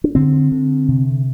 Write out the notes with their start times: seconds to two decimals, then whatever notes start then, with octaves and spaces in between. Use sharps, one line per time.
0.04 D4
0.15 D3 C4
0.52 D3
0.88 C3